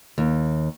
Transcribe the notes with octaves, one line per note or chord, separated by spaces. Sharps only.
D#2